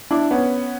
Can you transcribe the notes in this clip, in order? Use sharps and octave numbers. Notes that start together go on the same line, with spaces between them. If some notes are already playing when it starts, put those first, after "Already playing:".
D4 E4
B3 C#4